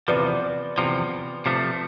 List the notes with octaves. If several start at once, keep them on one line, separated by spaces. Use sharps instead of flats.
E2 C3 F3 B4 D5
E2 C3 F3
C3 F3 A3